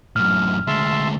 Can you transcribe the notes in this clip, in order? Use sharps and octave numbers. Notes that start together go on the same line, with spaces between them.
F#2 A2 F6
D2 G#3 E5 A5 C6